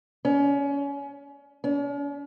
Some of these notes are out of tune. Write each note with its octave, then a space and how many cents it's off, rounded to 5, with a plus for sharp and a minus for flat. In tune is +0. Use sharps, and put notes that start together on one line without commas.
C#4 +25
C#4 +45